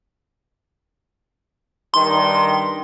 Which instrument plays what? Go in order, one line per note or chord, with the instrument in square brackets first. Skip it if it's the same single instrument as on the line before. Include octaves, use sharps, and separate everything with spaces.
[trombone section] G2 D#3 [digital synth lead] C6